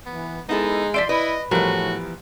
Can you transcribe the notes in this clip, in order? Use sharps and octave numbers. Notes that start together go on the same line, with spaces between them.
E3 B3
G#3 B3 D#4 E4 A4
F3 D5 E5 C6 B6 D7
E4 B4 D#5
A2 E3 F3 G3 B3 F#4 A#4